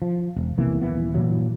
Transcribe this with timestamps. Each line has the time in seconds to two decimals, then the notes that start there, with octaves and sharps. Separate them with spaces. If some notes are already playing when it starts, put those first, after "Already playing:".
0.02 F3
0.36 E1
0.58 B1 C3 E3 A#3
0.82 D#1 E3 B3
1.15 G2 A#2 E3 F#3